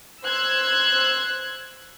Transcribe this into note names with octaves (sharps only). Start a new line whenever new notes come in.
C5 E6 F#6 G#6